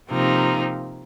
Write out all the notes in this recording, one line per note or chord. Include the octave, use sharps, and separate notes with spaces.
C3 F3 A#3 D#4